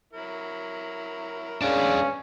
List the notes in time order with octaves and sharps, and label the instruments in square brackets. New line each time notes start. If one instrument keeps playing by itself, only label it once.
[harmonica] F#3 E4 A#4
[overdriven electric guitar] G#3 D4 [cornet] C#4 [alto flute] F5